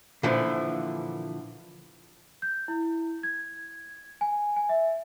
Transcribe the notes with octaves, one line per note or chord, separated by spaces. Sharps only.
A#2 D3 E3 F3
G6
E4
G#6
G#5
G#5
E5